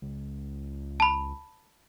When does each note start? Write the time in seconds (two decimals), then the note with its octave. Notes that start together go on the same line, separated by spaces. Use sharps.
0.02 C#2
1.00 A5 B5